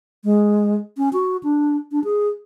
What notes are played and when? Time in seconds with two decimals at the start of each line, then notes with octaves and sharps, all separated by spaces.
0.24 G#3
0.98 C#4
1.13 F#4
1.43 D4
1.92 D4
2.04 G#4